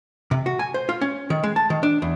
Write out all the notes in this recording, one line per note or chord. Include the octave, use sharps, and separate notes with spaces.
C3
F#4
G#5
C5
F4
C#4
D#3
G#3
A5
D#3
D4
E2